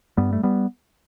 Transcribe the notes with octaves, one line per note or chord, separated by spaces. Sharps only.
G2 G3 B3
A3
G3 B3